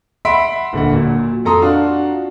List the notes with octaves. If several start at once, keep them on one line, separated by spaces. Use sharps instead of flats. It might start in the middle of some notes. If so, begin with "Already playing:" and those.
E5 F#5 B5 C6 B6 D7
D#1 D3 F#5
A#2 F#3
F2 A4 A#5 C6 D#6
D4 F4 F#4 F5